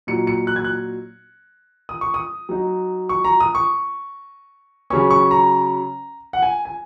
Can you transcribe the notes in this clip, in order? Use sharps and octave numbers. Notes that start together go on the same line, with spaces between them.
A#2 F#3 D#4 C#7
C#7
F#6
G#6
F#6
D#6
C#6
D#6
F#3 D#4
C#6
A#5
D#6
C#6
C#3 F#3 C#4 C#6
C#6
A#5
F#5
G#5
G#5